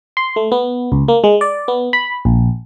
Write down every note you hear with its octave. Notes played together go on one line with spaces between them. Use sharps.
C6
A3
B3
C#2
A#3
G#3
D5
B3
B5
A#1